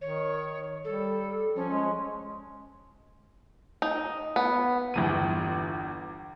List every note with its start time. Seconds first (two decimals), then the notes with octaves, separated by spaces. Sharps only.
0.01 D#3 C#5
0.84 G3 A4
1.56 F3 C#4
1.70 G#3
3.82 D#4
4.36 B3
4.94 G1 E2 D#7